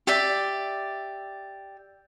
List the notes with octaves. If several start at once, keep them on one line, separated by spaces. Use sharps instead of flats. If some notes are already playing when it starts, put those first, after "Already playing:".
G4 D5 E5